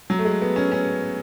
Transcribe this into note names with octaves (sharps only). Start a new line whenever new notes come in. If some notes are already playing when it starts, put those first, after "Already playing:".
F#3
A3
G#3
B3
C#4
C#4